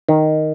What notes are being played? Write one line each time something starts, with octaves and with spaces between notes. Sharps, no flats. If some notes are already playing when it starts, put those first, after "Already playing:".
D#3